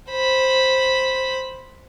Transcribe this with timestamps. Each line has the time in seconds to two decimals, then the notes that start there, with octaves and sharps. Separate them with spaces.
0.10 C5 B5